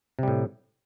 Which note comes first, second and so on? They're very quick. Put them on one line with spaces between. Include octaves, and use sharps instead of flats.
C3 G3 A2